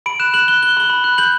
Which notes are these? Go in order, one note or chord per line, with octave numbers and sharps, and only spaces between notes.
B5 D7
F#6 E7
F#6 F#7
F#6 G7
F#6 G7
B5 G7
B5
F#6
G6 F#7